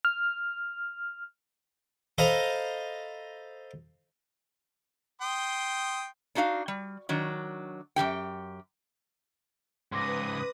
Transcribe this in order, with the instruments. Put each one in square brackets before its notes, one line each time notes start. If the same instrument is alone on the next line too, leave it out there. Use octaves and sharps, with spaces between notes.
[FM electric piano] F6
[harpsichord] A4 C5 D#5 F5 A#5 B5
[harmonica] G5 C6 D#6
[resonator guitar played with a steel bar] D4 D#4 F#4 E5 F5
G3
D#3 F#3 D4
F#2 E3 G4 G5
[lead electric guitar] C#2 G#2 [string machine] B4 D#6 [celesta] C6 D6 A#6